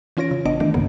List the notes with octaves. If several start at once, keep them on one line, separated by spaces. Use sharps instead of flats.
E3 C#4 F4 C#5 A#6 D7
C#3
A1 B3 D4 D#5 D7
D#3 E3 A3 D4
C2 G2 C#3 A#3 B3